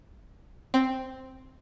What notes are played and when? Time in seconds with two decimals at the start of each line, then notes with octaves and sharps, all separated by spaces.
0.74 C4